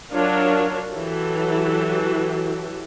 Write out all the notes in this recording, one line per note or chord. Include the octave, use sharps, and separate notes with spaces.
F#3 D4 F4 A#4 C#5
E3 F#3 F#4 G4 A4